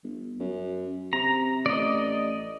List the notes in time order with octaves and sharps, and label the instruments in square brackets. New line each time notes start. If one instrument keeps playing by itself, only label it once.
[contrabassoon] G1
F#2
[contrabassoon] C3 [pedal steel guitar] A#5
[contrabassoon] A1 [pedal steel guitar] D5 D#5